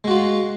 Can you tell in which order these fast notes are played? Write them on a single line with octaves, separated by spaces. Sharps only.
G#3 F#4 F4